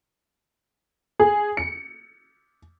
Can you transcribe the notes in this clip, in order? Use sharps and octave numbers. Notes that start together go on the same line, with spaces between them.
G#4
C#7